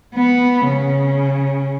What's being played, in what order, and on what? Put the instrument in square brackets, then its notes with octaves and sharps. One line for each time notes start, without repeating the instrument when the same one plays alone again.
[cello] B3
C#3